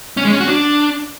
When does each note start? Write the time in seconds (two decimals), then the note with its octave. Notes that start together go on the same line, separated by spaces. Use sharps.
0.17 C#4
0.25 G#3
0.33 C#4
0.40 F#4
0.48 D4